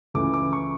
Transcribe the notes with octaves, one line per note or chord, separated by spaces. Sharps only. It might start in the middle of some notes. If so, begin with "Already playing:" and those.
C#2 C#3 E3 A3 E4 D6
D6
C#6